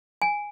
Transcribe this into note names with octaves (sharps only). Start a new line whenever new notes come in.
G#5